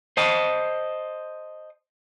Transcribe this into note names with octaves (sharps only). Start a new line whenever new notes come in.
C5 D#5 A5